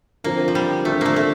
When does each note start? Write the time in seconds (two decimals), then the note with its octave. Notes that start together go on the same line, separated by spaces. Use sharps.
0.24 D3 F3 A#3 C4
0.48 F3
0.55 G3
0.85 D3 F3 A3 C4
1.01 A3 A#3
1.16 A3